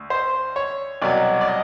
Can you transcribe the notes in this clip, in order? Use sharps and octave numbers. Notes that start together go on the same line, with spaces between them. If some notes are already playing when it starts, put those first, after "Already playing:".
Already playing: D2
C5
C#5
C2 B2 F#3 D5
D5
D#5